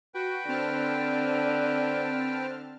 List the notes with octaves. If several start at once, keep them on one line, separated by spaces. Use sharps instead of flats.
F#4 B4 G5
D3 C4 A5 F6